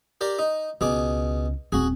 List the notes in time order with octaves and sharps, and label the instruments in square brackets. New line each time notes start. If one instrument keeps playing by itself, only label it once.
[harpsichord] G4 A#4 D5
D#4
[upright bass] C#2 [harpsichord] B2 G#4 D6
[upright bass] D#1 C4 [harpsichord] F#4 G#4